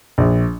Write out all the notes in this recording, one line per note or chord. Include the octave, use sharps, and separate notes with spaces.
A#1